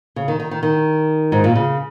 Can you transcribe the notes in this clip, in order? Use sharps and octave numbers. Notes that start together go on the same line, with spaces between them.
C#3
D#3
D#3
D#3
D#3
G#2
A#2
C#3